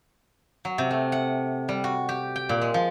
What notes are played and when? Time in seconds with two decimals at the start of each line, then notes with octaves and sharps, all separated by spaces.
0.65 F#3
0.78 C3
0.91 A3
1.12 F#5
1.69 G3
1.84 F#4
2.09 G4
2.36 G5
2.49 A#2
2.62 G#3
2.74 F3